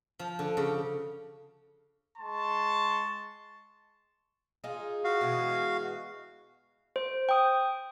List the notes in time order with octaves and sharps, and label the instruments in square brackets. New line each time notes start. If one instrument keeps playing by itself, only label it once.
[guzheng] F3
D3
C#3
[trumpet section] G#3 C6 C#6 [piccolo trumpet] A5
[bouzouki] D#4 F4 G#4
[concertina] F#4 F5
[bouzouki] B2 E3 G#3
[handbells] C5
G5 D#6